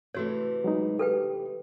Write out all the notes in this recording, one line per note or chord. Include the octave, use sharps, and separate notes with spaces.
C3 E3 A3 F#4 C#5
F#3 G#3 D#4
G4 A4 B4 G5